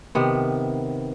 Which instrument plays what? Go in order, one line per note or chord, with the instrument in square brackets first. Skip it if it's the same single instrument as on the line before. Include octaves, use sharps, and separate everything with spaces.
[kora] C3 D#3 B3